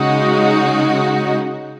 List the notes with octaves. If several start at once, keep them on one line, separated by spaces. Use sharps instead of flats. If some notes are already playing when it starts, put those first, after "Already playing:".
Already playing: C#3 G#3 D#4 F#4